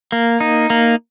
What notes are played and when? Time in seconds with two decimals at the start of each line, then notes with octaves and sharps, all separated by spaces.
0.12 A#3
0.41 D#4
0.70 A#3